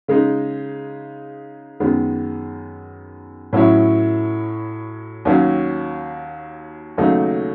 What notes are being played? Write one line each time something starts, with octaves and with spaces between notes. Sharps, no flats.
C#3 G#3 D#4
F#2 D#3 G#3 B3
A2 F#3 C#4 E4
D#2 D#3 F#3 C#4
D#2 C#3 F#3 A3 D#4